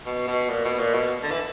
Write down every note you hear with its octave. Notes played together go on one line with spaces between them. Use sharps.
B2
B2
A#2
B2
A#2
B2
D3
E3